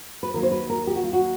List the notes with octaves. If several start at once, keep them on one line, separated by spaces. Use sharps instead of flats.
B4
D#2 D#3 F#3 A#4
C5
B4
A#4
G4
F#4
F4
F#4